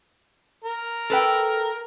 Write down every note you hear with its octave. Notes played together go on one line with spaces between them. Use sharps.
A#4
A4 B4 G5